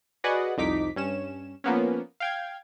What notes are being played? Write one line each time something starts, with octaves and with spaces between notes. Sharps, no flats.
F#4 G#4 B4 D5 D#5 F#5
C2 F2 D#4 D6 B6
G2 C#4 E7
F3 A#3 B3 C#4
F5 G5 G#6